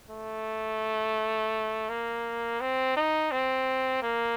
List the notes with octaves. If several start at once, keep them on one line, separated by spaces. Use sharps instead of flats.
A3
A#3
C4
D#4
C4
A#3